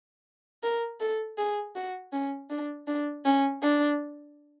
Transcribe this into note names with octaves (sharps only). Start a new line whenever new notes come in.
A#4
A4
G#4
F#4
C#4
D4
D4
C#4
D4